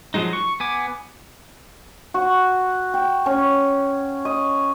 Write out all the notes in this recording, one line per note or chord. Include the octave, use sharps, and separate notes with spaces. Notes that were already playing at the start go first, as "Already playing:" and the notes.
F3 F#3 G#3 D#4
C#6
B3 G#5 D6
F#4
G5
C#4
D#5